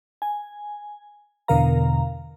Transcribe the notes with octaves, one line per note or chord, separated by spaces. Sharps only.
G#5
E2 B2 D3 A#4 F5 A#5